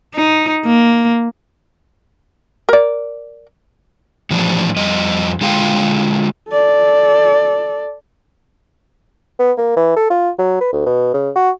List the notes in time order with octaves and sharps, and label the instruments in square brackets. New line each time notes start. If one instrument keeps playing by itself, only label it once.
[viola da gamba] D#4
A#3
[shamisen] A#4 D5
[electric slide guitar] A2 E3 F3 D4
F2 G3 D#5
D3 G#3 F4 A4 F5 G5
[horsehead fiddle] A4 D5
[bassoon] B3
A#3
E3
A4
F4
F#3
B4
D2
B2
C#3
F#4